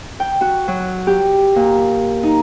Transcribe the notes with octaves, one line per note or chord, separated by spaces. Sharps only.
G5
F#4
F#3
G4
A#2
D#4